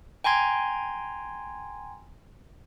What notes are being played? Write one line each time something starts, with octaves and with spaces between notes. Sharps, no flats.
G5 G#5 A#5 C6 G#6